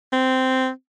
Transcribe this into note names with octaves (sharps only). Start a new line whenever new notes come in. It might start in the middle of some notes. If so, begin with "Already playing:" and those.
C4